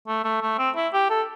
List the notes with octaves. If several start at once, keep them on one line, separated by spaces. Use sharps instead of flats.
A3
A3
A3
C4
E4
G4
A4